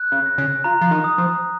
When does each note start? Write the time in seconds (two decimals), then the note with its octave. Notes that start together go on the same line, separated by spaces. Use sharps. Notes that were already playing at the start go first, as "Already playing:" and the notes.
Already playing: F#6
0.12 C#3
0.26 A#6
0.38 C#3
0.64 F3 A#5
0.81 F3
0.91 D#3
1.04 D#6
1.18 F3